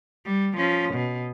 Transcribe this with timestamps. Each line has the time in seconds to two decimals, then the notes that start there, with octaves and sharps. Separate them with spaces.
0.25 G3
0.57 F3 C#4
0.94 B2